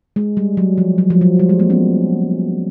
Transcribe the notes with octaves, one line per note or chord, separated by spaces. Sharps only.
G#3
G3
F#3
F3
F#3
F3
F#3
G3
G#3
G#3 A#3
B3 C#4